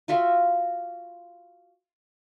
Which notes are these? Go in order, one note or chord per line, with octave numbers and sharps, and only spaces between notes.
F4 F#4 E5 F5